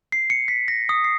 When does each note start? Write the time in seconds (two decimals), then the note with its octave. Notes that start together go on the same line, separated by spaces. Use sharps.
0.12 C7
0.30 C#7
0.48 B6
0.68 A#6
0.89 D#6
1.04 C7